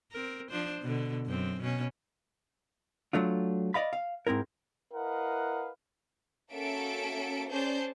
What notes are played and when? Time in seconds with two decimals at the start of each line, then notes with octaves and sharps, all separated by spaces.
0.12 C4 A#4
0.51 F3 D4 C5
0.81 B2 D3
1.25 F#2 C4
1.60 B2 C#4
3.13 F#3 A3 D4 F4
3.74 D5 D#5 F5 B5
3.93 F5
4.27 G#2 C4 E4 A#4
4.93 E4 A#4 B4 D#5 F5 F#5
6.52 A#3 C#4 F#4 A4 E5 D7
7.49 C#4 G#4 C5 D5 A5 G6